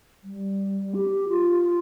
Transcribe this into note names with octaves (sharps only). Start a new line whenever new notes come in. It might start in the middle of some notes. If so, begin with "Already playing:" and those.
G3
G4
F4